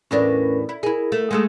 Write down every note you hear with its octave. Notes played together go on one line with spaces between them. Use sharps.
E2 A2 C#4 D4 A#4 B4
E4
E4 G#4 A#4
A3
G#3 A3 A4